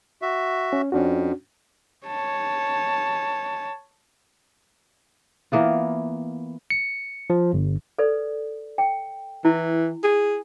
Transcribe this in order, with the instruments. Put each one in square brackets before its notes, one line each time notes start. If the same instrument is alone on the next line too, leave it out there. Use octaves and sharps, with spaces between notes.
[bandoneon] F#4 E5
[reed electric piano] C#4
[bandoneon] F2 [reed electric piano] C#4 D4 F#4
[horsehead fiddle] C#5 A5
[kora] E3 A#3 B3 F4
[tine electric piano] C#7
F3
G1
[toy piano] A4 B4 D5
G5
[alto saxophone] E3 [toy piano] E4
[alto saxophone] G#4